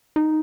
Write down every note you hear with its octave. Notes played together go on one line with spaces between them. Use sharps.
D#4